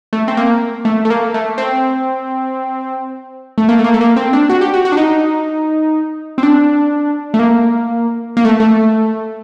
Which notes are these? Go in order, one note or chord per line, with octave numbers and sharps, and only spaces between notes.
A3
C4
A#3
A3
A3
A#3
A3
C4
A3
A#3
A3
A#3
A3
A#3
C4
D4
F#4
G4
F#4
F#4
D4
D#4
C4
D4
A3
A#3
A#3
A3
A3